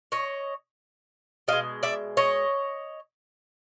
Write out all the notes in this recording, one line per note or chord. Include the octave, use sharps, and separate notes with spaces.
C#5 D#5
B2 G#3 D#5 F5
D5 E5
C#5 D#5